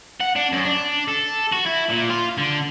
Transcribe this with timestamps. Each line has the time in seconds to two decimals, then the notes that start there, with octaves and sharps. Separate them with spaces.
0.20 F#5
0.36 D4
0.52 F#2
0.64 D4
1.08 A4
1.52 F#4
1.66 E4
1.90 A#2
2.10 F4
2.38 D3